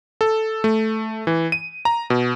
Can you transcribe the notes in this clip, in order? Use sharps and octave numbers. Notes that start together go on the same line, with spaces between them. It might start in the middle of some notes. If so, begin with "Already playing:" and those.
A4
A3
E3
D#7
A#5
B2